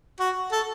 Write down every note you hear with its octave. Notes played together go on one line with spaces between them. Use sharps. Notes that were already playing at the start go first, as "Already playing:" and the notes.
F#4
A4